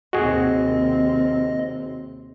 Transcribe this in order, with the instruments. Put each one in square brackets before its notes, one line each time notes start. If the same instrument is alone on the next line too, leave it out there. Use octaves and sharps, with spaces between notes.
[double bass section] D#2 C3 C4 [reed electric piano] F#4 G#4 [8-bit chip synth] D#5